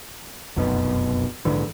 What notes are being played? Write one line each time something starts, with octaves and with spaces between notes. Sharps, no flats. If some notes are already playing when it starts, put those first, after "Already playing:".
F1 B1 F#2 B2
A#1 G#2 D3 E3